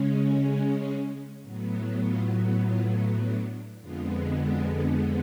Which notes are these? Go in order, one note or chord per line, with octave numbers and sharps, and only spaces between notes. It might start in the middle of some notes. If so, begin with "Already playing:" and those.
Already playing: C#3 G#3 C#4
F#4 A4
A2 F#3 B3
F4
F4
D4
F2 D3 G#3 B3 F4
D4 F#4